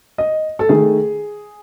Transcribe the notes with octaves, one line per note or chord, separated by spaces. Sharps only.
D#5
A4
D#3 A3 G#4